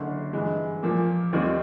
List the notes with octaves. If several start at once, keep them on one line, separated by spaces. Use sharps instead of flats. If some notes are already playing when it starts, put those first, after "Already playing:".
Already playing: F#1 F#2 D3
G2 E3 G#3
A#2 F3 A#3
D#2 D#3 G3 C4